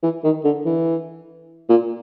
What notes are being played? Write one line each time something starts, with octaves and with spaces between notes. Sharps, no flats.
E3
D#3
D3
E3
A#2